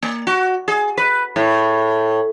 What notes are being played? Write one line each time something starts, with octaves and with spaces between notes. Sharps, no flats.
A#3
F#4
G#4
B4
A2